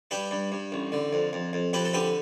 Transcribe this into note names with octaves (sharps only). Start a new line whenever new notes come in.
G2 G4 B4
G2
G2
A1
D3
F2
F2
F2
F2 G4 B4
A4
D3 G4 B4